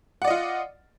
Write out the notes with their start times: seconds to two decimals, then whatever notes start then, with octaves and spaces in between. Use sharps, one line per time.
0.22 F#5
0.25 D5
0.27 D#5
0.30 F4